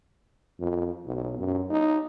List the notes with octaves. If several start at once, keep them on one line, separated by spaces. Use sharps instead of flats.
F2
B1
F#2
D#4